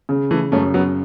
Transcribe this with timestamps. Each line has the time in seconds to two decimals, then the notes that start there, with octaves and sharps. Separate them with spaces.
0.09 C#3
0.30 E3 A3
0.52 F#2 A3 C#4
0.74 F#3 B3